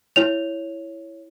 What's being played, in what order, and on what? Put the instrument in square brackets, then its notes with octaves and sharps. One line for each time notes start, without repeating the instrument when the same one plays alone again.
[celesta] E4 C#5 F7